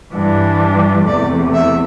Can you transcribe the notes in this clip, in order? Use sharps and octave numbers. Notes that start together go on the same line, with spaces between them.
G2 E3 G3 D4
E2 C3 E3 A3 D5
E5